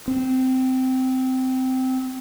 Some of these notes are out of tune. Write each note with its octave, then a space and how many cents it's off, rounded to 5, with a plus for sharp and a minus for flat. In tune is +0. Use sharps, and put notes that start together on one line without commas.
C4 -15